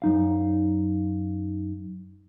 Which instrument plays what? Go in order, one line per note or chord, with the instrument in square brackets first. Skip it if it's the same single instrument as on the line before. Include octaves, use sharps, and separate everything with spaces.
[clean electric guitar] F#2 D#4 F5